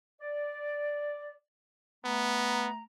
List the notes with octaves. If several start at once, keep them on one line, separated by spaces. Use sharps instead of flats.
D5
A3 B3 A#5